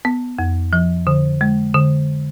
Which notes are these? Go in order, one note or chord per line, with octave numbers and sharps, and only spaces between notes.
B3
F2
F3
D3
G#3
D3